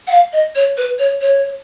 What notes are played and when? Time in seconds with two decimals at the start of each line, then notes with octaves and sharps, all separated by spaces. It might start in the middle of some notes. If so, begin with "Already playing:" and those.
0.07 F#5
0.11 F5
0.33 D#5
0.56 C#5
0.77 B4
0.99 C#5
1.21 C#5